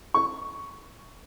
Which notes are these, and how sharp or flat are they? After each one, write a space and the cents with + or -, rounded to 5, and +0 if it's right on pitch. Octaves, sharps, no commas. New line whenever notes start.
C#6 +5